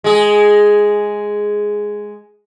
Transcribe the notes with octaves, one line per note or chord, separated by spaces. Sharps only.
G#3 G#4